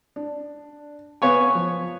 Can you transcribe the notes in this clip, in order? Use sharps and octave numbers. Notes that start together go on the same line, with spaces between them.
D4
B3 B4 C#5 F5 G#5 C#6
F3